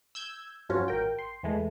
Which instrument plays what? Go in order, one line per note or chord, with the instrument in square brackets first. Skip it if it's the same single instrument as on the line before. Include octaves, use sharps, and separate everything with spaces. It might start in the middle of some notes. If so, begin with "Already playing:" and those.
[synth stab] E6 G6 G#6
G2 F3 F#3 C#4 F4 F#4
A1 A#4 G5
C6
E2 E3 G#3 A3